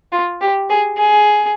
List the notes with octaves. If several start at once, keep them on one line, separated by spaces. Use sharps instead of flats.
F4
G4
G#4
G#4